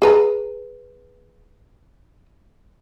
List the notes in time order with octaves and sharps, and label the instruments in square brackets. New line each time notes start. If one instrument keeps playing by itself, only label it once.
[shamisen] G#4 B4 A#5